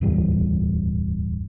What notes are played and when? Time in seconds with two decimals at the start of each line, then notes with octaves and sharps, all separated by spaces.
0.01 D1 E2 G2